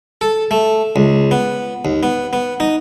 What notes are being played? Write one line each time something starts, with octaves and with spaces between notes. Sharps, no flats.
A4
A3
C#2
B3
D#2
B3
B3
D#4